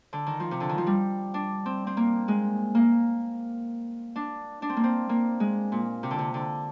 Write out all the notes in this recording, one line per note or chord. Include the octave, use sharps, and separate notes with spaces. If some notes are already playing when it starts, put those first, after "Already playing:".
D3
D#3
F3
C3
D3
D#3
F3
G3
D4
C4
C4
A#3
G#3
A#3
D4
D4
C4
A#3
C4
A#3
G#3
A#2
C3
D3
C3
D3